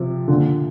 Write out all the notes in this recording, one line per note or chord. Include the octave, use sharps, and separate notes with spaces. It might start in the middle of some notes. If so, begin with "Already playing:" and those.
Already playing: C3 F3
A#2 D3